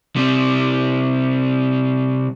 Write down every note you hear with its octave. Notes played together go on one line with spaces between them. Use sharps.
C3 G3